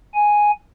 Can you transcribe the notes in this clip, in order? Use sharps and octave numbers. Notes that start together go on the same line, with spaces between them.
G#5